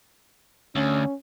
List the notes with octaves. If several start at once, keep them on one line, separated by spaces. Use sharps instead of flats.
D2 C#4